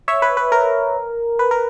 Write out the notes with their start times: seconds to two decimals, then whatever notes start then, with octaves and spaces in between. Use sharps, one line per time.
0.08 C#5 E5
0.22 B4
0.37 B4
0.52 A#4
1.39 B4
1.51 A#4